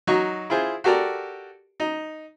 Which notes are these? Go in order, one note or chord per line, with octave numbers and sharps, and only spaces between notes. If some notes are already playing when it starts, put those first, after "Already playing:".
F#3 D#4 F#4 C#6
E4 F4 G#4 C5
F#4 G4 A4 A#4 D5
D#4